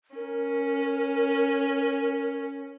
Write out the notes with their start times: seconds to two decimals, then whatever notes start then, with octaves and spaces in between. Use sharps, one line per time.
0.16 C#4 A#4